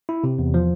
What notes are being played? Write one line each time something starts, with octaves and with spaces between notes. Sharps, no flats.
E4
C3
E2
F3